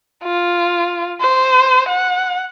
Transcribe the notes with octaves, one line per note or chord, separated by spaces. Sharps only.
F4
C5
F#5